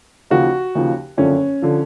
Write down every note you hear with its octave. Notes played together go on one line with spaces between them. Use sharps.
D#2 C#3 F3 F#4
D#2 C#3 F3
F#1 F2 D3 F3 C#4
D3 F3